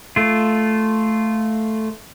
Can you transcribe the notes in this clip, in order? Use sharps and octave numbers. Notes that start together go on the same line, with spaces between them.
A3 F4